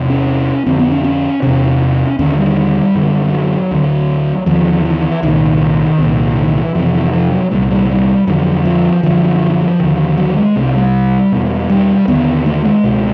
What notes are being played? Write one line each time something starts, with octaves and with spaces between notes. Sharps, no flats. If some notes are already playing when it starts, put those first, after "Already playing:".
Already playing: E2 C3
C#4
F2 D3 C4
B3
C#4
C#4
E2 C3 C#4
D#2 D3 C#4
G3
F#2 D3
F#3
D2 D3
D#2 D3 F3
E3
C2 A#2 D#3
C2 A#2
D#3
D#3
E3
F2 C3 E3
E3
F3
F#3
C2 A#2 G3
G3
G3
F2 D3 F#3
F3
F#2 D3 F3
D#2 D3
F#3
G#3
C2 C3 A3
G3
E2 B2
G3
D#2 D3 B3
A3
G#3
C#2 B2